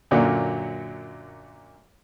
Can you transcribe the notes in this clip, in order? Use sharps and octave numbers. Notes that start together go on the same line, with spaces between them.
F#2 A#2 D3 F#3 A#3 D4